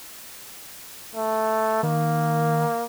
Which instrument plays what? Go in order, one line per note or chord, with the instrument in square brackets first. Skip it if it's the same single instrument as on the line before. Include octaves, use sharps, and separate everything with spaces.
[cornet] A3
[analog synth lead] D#3 [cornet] A#3